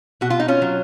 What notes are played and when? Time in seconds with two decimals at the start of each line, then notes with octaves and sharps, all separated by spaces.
0.21 B2 F#4
0.30 F4
0.40 D#4
0.48 C#4 F4
0.62 F#3